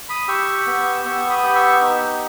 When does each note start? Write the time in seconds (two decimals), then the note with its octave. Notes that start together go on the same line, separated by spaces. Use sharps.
0.09 B5 D#6
0.28 G4 C#6 E6
0.66 B3
1.05 B3 C#6 E6
1.30 B5 D#6
1.43 G4
1.55 C#6 E6
1.81 D#4